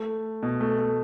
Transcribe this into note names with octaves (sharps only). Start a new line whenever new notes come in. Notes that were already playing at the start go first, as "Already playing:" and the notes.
Already playing: A3
B2
A3
A3